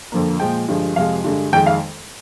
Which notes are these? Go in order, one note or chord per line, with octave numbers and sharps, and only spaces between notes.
F2 D3 F3 A#3
A#2 F3 G#3 G5
G2 D3 F3 G#3
F2 C3 F3 G#3 F5
G2 D3 G#3
F2 D#3 G#3 G5
F5